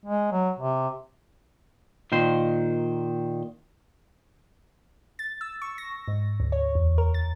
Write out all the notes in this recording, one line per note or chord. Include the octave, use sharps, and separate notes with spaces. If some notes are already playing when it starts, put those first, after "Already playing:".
G#3
F#3
C3
A#2 D#3 C5 C6
A6
E6
C#6
A#6
G#2
D2
C#5
E2
A#4
A6